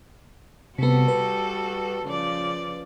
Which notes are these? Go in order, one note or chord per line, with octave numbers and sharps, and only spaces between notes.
C3 G3 B3 F#4 A4
B4
C#3 F3 D5